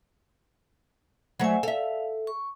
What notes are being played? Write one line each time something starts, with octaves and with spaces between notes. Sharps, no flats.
F#3 A3 C5 E5 G#5
A4 E5 F5
C#6